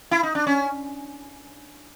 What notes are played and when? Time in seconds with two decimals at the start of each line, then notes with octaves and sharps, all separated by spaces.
0.11 E4
0.23 D#4
0.35 D4
0.47 C#4